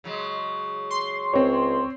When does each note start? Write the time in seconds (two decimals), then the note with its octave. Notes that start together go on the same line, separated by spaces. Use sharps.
0.04 C#3 F#3 G#3
0.90 C6
1.34 C#2 C4 C#5